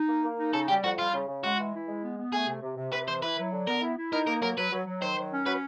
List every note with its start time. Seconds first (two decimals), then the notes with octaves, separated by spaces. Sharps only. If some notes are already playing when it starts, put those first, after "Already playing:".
Already playing: D#4
0.09 A#3
0.24 A#3
0.38 D#4
0.53 C#3 A4
0.68 G3 G4
0.83 F2 F#4
0.98 G3 F4
1.14 C#3
1.28 C#3
1.44 G#3 F#4
1.59 E3
1.74 E4
1.88 G#3
2.03 B3
2.18 B3
2.32 A3 G#4
2.48 C3
2.62 C3
2.77 C3
2.92 C3 B4
3.08 E3 C5
3.22 E4 B4
3.38 F#3
3.52 D3
3.67 B3 A#4
3.82 E4
3.97 E4
4.13 D#4 A#4
4.27 A#3 A#4
4.42 F#3 A#4
4.57 F#3 B4
4.72 F#3
4.86 F#3
5.01 D#3 C5
5.16 F#3
5.32 C#4
5.46 F#3 B4